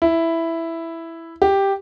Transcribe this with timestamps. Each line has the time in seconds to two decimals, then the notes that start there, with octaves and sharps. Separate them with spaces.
0.02 E4
1.42 G4